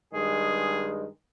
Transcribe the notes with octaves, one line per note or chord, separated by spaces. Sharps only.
G2 D#3 G#3 G#4